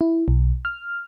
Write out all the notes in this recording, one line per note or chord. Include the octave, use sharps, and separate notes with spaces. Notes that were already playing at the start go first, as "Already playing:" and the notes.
E4
B1
F6